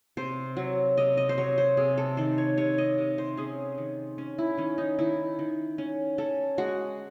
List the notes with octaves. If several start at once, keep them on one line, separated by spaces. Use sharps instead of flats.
C3 C5
F#3
C3 D#5
D#5
C5
F#3 C#5
C5
C3 G#4
A4
D#3 C5
C#5
C3 C#5
D#5
C3
C5
C#4 G#4
D#3
C#4
E4
D#3 C#4
D#4
D#3 E4
D#3
C#4
C#4 A4
G#3 F#4